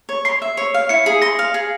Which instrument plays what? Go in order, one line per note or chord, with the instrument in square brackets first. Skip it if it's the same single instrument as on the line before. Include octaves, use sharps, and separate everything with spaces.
[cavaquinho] C#5
[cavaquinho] C6 [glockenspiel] C7
[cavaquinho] E5
C#5
F5
[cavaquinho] E4 [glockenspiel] C#7
[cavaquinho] G#4
[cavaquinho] C6 [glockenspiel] A#6
[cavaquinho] F5
G#4